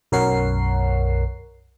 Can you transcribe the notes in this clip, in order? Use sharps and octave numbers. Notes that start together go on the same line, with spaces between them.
B1 F#2 A#4 C#5 F#5 C7